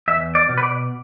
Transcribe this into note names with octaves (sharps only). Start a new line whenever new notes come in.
E2 E5
D5
B2
B4
D5